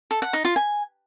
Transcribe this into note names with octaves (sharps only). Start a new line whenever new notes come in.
A4
F#5
D#4
F4
G#5